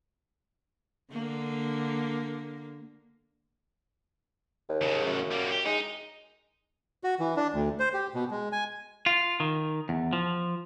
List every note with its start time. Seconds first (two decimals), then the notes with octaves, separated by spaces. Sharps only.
1.12 D3 A#3
4.69 D#2
4.81 E2 C#3
5.06 F#2
5.31 G3 A#3
5.51 G4
5.66 G#3 D#4
7.04 F#4
7.20 E3
7.37 D4
7.54 D2
7.79 C5
7.94 G4
8.14 B2
8.31 G#3
8.52 G#5
9.06 F4
9.40 D#3
9.89 E2
10.13 F3